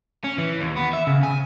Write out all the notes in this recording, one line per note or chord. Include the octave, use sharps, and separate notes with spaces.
C#4
E3
D#2
B3
E5
C#3
G#5